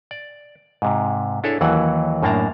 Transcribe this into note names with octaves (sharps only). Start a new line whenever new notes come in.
D5
G#2 C3
D4 E4 G#4 A4 C#5
D#2 E3 F#3 F#5
F#2 A2 A#3 D4 A5 A#5